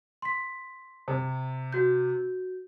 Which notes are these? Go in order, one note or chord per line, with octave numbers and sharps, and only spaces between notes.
C6 B6
C3
F#4 G6